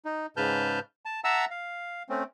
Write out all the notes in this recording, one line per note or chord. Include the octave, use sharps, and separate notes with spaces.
D#4
G#2 C#3 B4 A5 F6 G6
A5
E5 F#5 A5 A#5 E6
F5
A3 C4 C#4